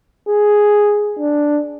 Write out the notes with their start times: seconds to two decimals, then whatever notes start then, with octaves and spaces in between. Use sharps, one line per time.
0.29 G#4
1.19 D4